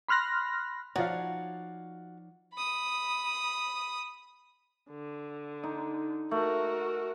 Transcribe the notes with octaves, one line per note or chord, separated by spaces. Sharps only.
B5 C6 F6 F#6 A#6
F3 D#4 F#4 C#5 D5 F5
B5 D#6
D3
D#4
A3 F#4 A#4